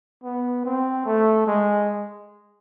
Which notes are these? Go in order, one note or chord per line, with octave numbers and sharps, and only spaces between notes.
B3
C4
A3
G#3